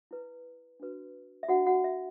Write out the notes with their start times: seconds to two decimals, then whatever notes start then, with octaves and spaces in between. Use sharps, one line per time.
0.11 E4 B4
0.80 D4 F#4 B4
1.43 E5
1.49 D4 F#4 C5 F#5
1.66 F#4 F#5
1.84 E5